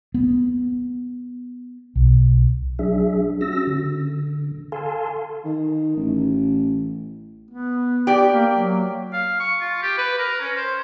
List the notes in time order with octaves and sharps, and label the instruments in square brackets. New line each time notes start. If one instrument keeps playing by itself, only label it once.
[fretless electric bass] B3
B1
[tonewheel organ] F#3 D4 G#4 E5
C#4 F#4 E6 A#6
D3
A4 F5 G#5 A5 C6
[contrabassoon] D#3
A1
[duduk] B3
[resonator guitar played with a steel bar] G4 D5
[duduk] A#3
F#3
[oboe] F5
C#6
F4
G4
B4
A#4
C#4
C5